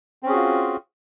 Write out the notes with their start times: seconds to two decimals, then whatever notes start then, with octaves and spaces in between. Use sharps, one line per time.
0.23 C4
0.26 C#4
0.29 G#4
0.32 F#4
0.36 F4